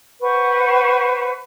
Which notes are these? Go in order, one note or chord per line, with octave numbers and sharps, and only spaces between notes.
B4 C5 F#5 C#6